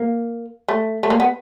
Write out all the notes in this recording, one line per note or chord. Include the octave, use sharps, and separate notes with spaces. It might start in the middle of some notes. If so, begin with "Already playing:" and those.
Already playing: A#3
A3
A3
A#3
B3